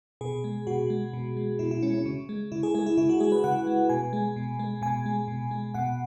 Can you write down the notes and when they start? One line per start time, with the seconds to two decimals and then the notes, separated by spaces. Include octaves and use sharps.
0.21 B2 G#4
0.44 G#3
0.67 B2 F#4
0.90 G#3
1.13 B2
1.37 G#3
1.59 B2 E4
1.71 E4
1.82 G#3 C#4
1.94 C#4
2.06 C#3
2.29 G#3
2.52 C#3 E4
2.63 G#4
2.74 G#3 G#4
2.86 E4
2.97 C#3 E4
3.09 F#4
3.20 G#3 G#4
3.32 B4
3.44 C#3 F#5
3.67 G#3
3.89 B2 G#5
4.13 G#3
4.36 B2
4.59 G#3
4.82 B2 G#5
5.06 G#3
5.28 B2
5.51 G#3
5.74 B2 F#5